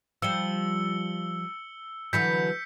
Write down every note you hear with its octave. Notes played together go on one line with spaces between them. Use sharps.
F3 G3 E6 C#7 G7
D3 E3 F#3 G6 B6 C#7